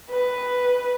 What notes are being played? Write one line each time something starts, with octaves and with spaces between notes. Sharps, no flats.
B4